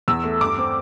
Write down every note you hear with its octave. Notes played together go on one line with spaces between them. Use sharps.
E2 E6
A3
G2 D6
C4